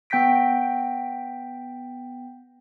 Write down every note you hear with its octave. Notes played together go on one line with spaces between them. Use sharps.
B3 G5 G6 A#6 B6 D7